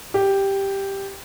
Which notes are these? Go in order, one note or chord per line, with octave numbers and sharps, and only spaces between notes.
G4